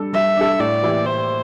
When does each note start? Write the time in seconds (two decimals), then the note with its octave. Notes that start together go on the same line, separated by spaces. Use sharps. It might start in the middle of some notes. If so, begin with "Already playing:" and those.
Already playing: G3 D4 A4
0.13 G3 E5
0.37 D4 A4
0.59 A2 D5
0.83 E3 A#3 E4 G4
1.06 A2 C5